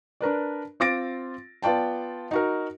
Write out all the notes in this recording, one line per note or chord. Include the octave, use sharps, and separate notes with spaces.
D4 A#4 B4 D5
C4 F4 D6 A6 A#6 D7
B3 F4 D5 G5 A5
D#4 F#4 A#4